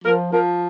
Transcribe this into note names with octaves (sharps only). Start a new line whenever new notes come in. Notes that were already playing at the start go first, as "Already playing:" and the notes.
F3 A#4
F3 A#4